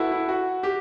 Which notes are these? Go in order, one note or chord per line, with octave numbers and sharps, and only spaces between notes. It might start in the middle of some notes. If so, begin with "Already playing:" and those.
Already playing: E4 F#4 A4 B4
E4
F#4
G4